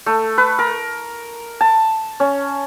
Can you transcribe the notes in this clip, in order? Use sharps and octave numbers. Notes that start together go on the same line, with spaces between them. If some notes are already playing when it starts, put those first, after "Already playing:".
A3
B4
A#4
A5
C#4